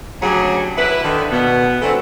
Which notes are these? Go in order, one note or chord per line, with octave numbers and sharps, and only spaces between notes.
D2 C#3 F#3 G4 G#4 C#5
E4 B4
D3 D#3
B2 B3
E3 F#3 A3 C4 D4 A4